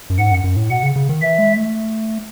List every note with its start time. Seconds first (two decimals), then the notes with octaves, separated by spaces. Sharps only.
0.10 F#2
0.18 G#2 F#5
0.31 F#2
0.44 F#2
0.56 A2
0.70 B2 F#5
0.83 C#3
0.96 C#3
1.09 D#3
1.22 E3 E5
1.39 G#3
1.56 A3